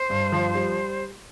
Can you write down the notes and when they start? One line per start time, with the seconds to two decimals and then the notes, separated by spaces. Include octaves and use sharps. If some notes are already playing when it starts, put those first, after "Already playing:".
Already playing: C5
0.10 G2
0.32 F3
0.54 G3